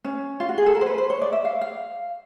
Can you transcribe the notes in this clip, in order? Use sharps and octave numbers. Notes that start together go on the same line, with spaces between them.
C#4
F4
F#4
G#4
A4
A#4
C5
B4
C5
C#5
D5
E5
F5
F5